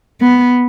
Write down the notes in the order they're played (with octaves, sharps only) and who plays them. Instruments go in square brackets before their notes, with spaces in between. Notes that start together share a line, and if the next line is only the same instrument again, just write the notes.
[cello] B3